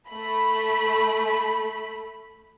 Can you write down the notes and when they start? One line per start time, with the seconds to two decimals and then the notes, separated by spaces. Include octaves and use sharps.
0.11 A3 B5